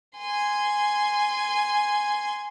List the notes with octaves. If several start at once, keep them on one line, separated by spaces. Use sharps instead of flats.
G#5 C6